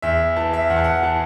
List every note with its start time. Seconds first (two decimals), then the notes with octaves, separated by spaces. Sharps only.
0.02 E2 E5
0.36 E3 A5
0.53 E5
0.70 E2 F#5
0.76 A5
0.84 F#5
1.03 E3 A5